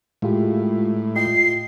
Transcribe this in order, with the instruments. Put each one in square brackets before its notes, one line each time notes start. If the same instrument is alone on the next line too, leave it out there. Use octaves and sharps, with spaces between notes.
[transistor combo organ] A2 [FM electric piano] G#3 F4 G4
[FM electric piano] F4 D#5 G5 [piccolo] C7